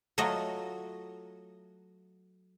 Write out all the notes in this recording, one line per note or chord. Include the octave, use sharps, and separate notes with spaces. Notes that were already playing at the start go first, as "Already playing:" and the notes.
F#3 A3 F4 F#4 D#5